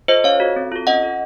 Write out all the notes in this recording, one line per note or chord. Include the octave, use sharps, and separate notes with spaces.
F4 A4 C5 D#5
C#4 C#5 F5
F#4 A4
C4
F4 A4
C#4 D#5 F#5
A4